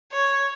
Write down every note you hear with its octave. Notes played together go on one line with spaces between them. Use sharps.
C#5